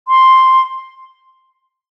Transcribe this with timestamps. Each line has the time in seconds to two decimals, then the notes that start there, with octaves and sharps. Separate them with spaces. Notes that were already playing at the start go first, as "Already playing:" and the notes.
0.08 C6